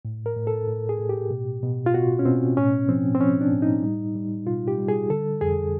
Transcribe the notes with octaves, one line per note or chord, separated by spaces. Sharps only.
A2
A#4
A2
A4
A2
G#4
A2
G4
B2
B2
F4
B2 F#4
C#4
B2 C4
A2 C#4
F3 C4
C4
F3 C#4
D4
A2
D#4
G3
G3
B2 F4
G4
G3
G#4
D3 A4
F2 G#4